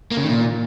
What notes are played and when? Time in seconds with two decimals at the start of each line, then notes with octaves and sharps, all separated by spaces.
0.11 A#3
0.17 C#3
0.23 D#3
0.29 A#2